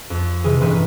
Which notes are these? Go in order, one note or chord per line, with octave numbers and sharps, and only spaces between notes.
F2
C3 E3 G#4
A1 G2 C4 B4 D#7